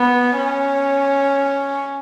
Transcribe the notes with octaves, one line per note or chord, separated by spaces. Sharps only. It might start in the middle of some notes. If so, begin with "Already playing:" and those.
Already playing: B3
C#4